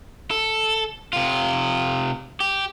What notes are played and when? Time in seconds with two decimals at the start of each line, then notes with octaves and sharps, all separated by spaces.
0.31 A4
1.13 C3 F4
2.40 G4